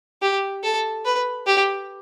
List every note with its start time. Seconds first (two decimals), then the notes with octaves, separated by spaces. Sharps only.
0.22 G4
0.63 A4
1.05 B4
1.47 G4